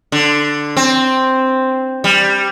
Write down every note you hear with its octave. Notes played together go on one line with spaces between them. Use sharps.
D3
C4
G3